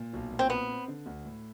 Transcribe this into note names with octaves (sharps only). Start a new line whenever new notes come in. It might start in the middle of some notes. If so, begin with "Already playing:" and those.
Already playing: A#2
B1
A#2
C4
B3 C4
C4
D3
D2
A2